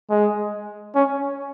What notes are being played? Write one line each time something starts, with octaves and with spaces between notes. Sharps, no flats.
G#3
C#4